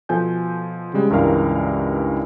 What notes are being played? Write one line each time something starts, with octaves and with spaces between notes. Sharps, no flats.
B2 F3 A4 G#5 G6
C#3 G3 G#3
C#2 G2 E3 A#4 F5